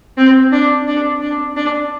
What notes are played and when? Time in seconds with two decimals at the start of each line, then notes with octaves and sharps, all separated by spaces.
0.18 C4
0.52 D4
0.87 D4
1.22 D4
1.56 D4